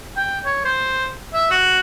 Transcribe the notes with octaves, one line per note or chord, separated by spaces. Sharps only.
G5
C#5
C5
E5
F#4